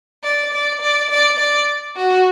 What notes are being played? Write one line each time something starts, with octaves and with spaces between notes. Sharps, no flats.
D5
D5
D5
D5
D5
F#4